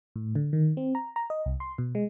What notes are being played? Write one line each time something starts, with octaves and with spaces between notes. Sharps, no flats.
A2
D3
D#3
C4
A#5
A#5
D#5
C2
C6
B2
G#3